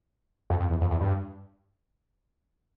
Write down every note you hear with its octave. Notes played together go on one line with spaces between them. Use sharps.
F2
F2
E2
F2
E2
G2